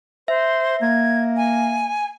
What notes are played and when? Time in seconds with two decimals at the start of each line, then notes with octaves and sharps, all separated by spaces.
0.28 C5 E5
0.82 A#3 G#6
1.37 G#5